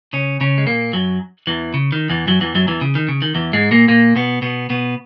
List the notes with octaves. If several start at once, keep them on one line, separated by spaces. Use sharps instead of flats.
C#3 C#4
C#3 C#4
G#3
A#2 A#3
F#2 F#3
E2 E3
C#3
D#3
E2 E3
F#2 F#3
E2 E3
F#2 F#3
E2 E3
C#3
D#3
C#3
D#3
E2 E3
G#2 G#3
A#2 A#3
A#2 A#3
B2 B3
B2 B3
B2 B3